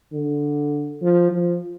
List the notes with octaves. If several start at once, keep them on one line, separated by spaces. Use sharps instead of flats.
D3
F3
F3